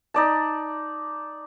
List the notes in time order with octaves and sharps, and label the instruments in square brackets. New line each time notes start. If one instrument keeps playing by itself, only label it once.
[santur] D#4 D5 A5